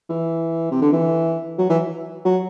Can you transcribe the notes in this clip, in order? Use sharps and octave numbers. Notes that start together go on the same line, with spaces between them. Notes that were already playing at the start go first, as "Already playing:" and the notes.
E3
C3
D3
E3
F#3
E3
F#3